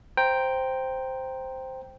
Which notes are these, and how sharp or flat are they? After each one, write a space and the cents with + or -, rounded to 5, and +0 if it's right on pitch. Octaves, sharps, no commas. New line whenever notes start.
C5 +0 G5 +0 A#5 +0